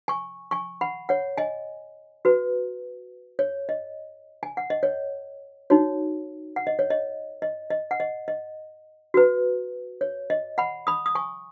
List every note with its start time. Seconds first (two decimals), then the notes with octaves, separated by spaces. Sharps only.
0.08 G#5 C#6
0.51 G#5 C#6
0.81 F#5 B5
1.09 C#5 F#5
1.37 D#5 G#5
2.25 F#4 B4
3.39 C#5
3.69 D#5
4.43 G#5
4.57 F#5
4.70 D#5
4.83 C#5
5.70 D#4 F#4 C#5
6.56 F#5
6.67 D#5
6.79 C#5
6.90 D#5
7.42 D#5
7.70 D#5
7.91 F#5
8.00 D#5
8.28 D#5
9.14 F#4 B4
10.01 C#5
10.30 D#5
10.58 F#5 B5
10.87 B5 D#6
11.06 D#6
11.15 G#5 C#6